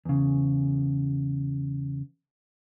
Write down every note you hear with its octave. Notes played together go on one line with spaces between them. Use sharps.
E2 C#3